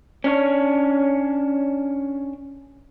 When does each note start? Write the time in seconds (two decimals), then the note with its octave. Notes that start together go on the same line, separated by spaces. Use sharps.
0.24 C#4 D4 C#5